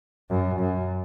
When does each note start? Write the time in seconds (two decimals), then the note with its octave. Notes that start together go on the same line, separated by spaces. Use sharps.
0.30 F#2
0.60 F#2